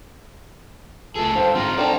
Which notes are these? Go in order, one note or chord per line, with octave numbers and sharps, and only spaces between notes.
C#2 A3 G#4 A4
G2 D3 C5 F5 G5
G#2 C4 D#4 F4 A#5
D3 C4 D4 C5 D5